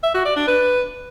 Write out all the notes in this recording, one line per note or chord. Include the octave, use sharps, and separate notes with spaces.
E5
F#4
D5
D4
B4